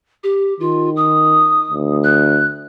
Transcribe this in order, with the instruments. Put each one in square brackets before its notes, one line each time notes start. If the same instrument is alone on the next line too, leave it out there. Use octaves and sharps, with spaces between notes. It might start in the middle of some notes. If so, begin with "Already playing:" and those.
[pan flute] G4
[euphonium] D#3 [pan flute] F4
[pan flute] D#6
[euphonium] D2
[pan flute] F#6